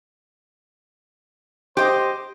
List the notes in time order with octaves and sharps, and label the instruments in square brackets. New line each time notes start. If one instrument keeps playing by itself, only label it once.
[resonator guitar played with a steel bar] G4 D#5 [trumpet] C5